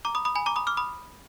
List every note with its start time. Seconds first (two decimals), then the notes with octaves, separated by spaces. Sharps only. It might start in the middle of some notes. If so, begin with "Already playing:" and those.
0.05 A#5 D6
0.15 B5 D#6
0.25 B5 D#6
0.36 G#5 B5
0.46 A#5 D6
0.56 B5 D#6
0.67 D6 F6
0.77 B5 D#6